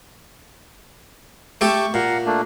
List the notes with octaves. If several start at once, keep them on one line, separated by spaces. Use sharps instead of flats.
A3 G4 A4 C#6
A#2 F5 F#5 A#5
A3 A#3 D4